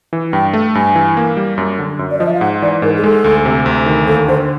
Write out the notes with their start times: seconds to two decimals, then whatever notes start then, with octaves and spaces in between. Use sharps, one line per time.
0.13 E3
0.33 G2 G5
0.54 A3
0.75 G2 G#5
0.95 E3
1.17 A#3
1.37 G3
1.58 F#2
1.79 D3
1.99 F#2
2.11 D5
2.18 F3 D#5
2.26 E5
2.34 F5
2.41 G#2 F#5
2.62 E3 D5
2.82 G#2 A#4
2.98 G#4
3.04 G#3 A4
3.24 D2
3.45 C3
3.66 D2
3.86 D#3
4.07 D#2 A4
4.28 D3 C5